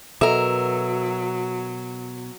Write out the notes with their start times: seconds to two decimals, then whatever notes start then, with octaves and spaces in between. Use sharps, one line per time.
0.21 B2 F#3 A4 A#4 E5